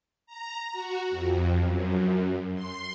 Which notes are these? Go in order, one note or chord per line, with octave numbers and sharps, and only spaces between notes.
A#5
F#4
F2
F#2
C6